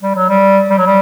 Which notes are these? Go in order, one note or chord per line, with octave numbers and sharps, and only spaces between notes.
G3
F#3
G3
G3
F#3
G3